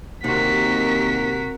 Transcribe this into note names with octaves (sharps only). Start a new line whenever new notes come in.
D#2 C3 F#4 A#4 B6